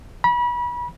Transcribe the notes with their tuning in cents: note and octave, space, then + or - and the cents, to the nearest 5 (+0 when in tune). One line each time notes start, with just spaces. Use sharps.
B5 -30